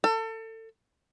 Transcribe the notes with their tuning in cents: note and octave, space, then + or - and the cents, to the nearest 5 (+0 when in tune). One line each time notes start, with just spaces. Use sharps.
A4 +30